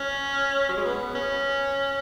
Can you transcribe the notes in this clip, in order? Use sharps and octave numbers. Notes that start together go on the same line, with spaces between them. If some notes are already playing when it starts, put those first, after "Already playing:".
Already playing: C#4
F#3
G#3
B3
C#4